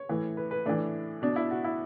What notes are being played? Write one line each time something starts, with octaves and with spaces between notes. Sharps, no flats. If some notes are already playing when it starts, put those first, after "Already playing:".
Already playing: C#5
A2 E3
B4
B4
A2 E3 D4
B2 D4
E4
F#4
E4